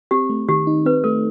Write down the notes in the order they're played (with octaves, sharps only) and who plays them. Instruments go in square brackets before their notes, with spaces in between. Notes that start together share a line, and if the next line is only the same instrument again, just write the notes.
[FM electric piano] C4 [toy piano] G4
[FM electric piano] A3
[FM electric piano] D#3 [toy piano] G4
[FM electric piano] D#4
[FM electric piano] C4 [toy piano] B4
[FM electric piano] A3 [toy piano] A4